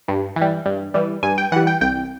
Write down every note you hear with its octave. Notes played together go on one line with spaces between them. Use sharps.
G2
E3
G3
G2
E3 G3
G2 G#5
G5
E3 G3 F#5
G5
C2 G5